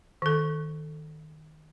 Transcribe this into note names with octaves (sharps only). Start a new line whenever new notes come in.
D#3 A4